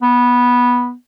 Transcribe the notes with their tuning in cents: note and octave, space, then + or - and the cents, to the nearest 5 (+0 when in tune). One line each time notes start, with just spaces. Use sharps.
B3 -10